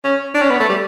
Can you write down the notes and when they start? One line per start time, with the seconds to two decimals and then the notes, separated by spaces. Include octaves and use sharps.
0.04 C#4
0.34 D4
0.41 C#4
0.50 B3
0.60 A3
0.69 G3